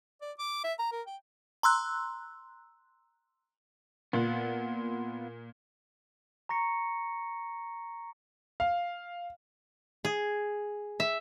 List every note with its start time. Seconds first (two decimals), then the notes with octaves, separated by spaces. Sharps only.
0.22 D5
0.39 D6
0.64 E5
0.79 A#5
0.92 A#4
1.07 G5
1.63 A#5 C6 E6 F#6
4.13 A#2 B3 F4 F#5
6.49 A#5 C#6 A#6 C#7
8.60 F5
10.05 G#4
11.00 E5